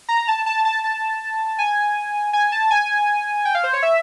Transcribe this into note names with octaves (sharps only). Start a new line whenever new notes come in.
A#5
A5
A5
A5
A5
G#5
G#5
A5
G#5
G5
F5
C5
C#5
E5